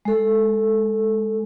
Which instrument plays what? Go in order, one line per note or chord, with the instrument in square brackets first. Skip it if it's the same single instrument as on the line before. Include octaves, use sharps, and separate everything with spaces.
[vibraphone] G#3 A4